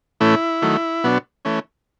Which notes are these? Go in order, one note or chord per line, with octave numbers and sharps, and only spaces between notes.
A2 E3 A3 C#4 E4
D#3 F#3 A3
B2 F#3 B3 D4
E3 A3 C#4